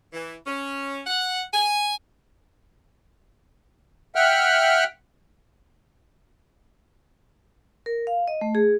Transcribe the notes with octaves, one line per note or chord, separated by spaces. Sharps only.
E3
C#4
F#5
G#5
E5 F#5 G5 F6 F#6
A#4
F5
D#5
A3
G#4